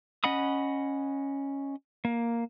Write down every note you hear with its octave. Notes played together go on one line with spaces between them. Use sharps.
C#4 D#5 F#5 B5 D#6
A#3